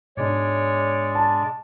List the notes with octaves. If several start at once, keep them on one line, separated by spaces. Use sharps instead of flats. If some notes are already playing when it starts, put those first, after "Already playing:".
G#2 B2 G#3 D4 C#5 D5
A5